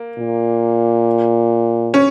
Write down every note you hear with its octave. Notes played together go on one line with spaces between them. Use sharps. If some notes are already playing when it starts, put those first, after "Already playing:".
Already playing: A#3
A#2
C#4